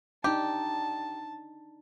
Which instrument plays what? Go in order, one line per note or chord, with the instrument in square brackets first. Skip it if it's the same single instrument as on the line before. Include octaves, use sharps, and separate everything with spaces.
[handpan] D4 D#4 [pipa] G4 [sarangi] A5